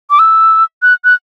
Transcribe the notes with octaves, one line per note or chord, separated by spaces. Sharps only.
D6
E6
F#6
F#6